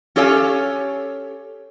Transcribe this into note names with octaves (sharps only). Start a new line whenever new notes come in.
C#4 G4 A4 C#5 F5 G#5